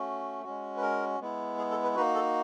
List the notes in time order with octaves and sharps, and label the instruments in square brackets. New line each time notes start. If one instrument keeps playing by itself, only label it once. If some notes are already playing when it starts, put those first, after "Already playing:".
Already playing: [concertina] A3 C#4 F#4
G#3 C#4 F#4
B4
A#4
G#3 B3 E4
G#4
A4
B4
A#3 D#4 F#4 B4
A4